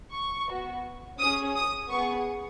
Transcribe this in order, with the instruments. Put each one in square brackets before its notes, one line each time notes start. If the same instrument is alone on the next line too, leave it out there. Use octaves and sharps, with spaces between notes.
[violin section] C#6
B3 F#4
C#4 G#4 D#6
D#6
B3 G#4 C#6